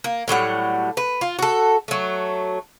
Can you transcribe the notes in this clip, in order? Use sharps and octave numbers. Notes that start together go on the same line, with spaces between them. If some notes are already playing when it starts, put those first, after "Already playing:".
A#3
A2 F#3 G3 F#5
B4
F4
F#4 A4
F#3 A3